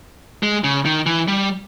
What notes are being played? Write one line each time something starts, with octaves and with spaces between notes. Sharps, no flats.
G#3
C#3
D#3
E3
G3